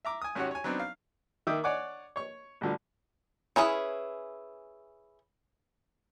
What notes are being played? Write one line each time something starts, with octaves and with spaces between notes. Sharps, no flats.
E5 A#5 D6
G#5 D#6
G#1 C#4 F#4 G4 C#5 F#5
C#5 G#5
F#3 B3 C4 D4 D#4
F5
D#3 E5 G5 D6 D#6
C#5 D5 F#5 G#5 C#6 D6
C#5 C#6
A1 B2 D3 F3 G3
C#4 E4 G#4 B4